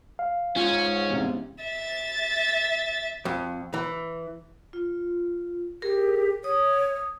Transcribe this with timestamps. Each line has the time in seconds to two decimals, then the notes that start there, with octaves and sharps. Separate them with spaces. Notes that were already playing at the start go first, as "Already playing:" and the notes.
0.19 F5
0.56 G#2 C#4 F4
1.10 A1 E2 C3
1.63 E5 A6
3.25 F2
3.74 E3
4.73 F4
5.82 G4 G#4 A#4
6.44 C#5 D#6